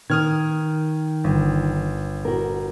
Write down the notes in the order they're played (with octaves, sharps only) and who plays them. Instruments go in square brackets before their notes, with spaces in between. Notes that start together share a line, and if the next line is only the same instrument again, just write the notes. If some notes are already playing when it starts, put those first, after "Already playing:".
[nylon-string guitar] D#3 [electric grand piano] D#6 F6 G#6
[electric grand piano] G1
[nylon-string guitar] F#4 A#4